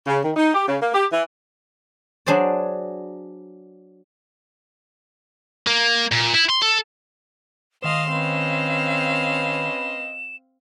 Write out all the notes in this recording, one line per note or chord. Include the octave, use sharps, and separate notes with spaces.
C#3
D#3
D#4
G4
C#3
A#3
G4
E3
F#3 D4 G#4 C5 D5
A#3
A#2
E4
C6
A4
D#3 C5 D#5 F5 C6 E7
C4 C#4 B4 D#5 F5